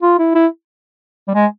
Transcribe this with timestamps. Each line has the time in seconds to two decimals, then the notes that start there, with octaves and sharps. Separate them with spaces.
0.02 F4
0.19 E4
0.35 E4
1.28 G3
1.34 G#3